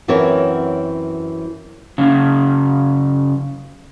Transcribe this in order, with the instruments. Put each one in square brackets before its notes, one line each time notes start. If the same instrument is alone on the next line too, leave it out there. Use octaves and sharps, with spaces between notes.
[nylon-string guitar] F#2 E3 C4 F#4 A#4 C#5
[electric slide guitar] F#2 C#3